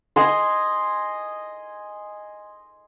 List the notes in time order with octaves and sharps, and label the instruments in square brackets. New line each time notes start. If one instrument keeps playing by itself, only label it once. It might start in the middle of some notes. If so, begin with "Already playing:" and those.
[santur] D#5 G#5 C6